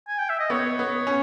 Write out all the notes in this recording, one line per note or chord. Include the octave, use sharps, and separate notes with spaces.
G#5
G5
E5
D#5
B3 C#5
B3
C#4